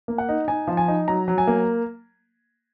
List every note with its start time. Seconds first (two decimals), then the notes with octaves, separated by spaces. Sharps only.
0.08 A#3
0.18 F#5
0.29 D#4
0.48 D#4 G#5
0.67 F3
0.77 G#5
0.88 D#4
1.08 F#3 A#5
1.28 F#3
1.38 G#5
1.47 A#3